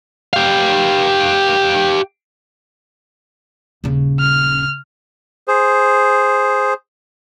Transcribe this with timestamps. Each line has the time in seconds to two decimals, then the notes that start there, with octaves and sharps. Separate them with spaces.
0.33 G4 F5
3.84 D#1 C#3
4.20 F6
5.48 G#4 C5